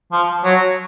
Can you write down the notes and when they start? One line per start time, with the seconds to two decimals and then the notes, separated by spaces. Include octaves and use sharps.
0.12 F3
0.44 F#3